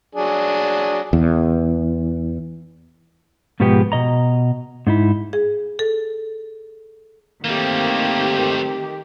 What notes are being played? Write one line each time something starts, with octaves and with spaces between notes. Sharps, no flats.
F#3 D4 G#4
E2
G#2 B2 F3 G#3 B3 G4
B2 D#5 A#5
G#2 D#4 E4
G#4
A4
D#3 E3 G3 A3 A#3 C4 G4